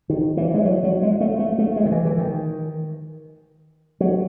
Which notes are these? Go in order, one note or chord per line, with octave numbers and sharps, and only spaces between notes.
D#3
E3
G#3
F#3
F#3
G#3
A3
A3
A3
G#3
D#3
E3
E3
D#3
F#3